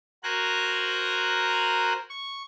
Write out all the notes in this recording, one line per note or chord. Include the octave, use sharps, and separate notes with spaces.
F#4 A#4 C5 G#5 A#5 F#6
C#6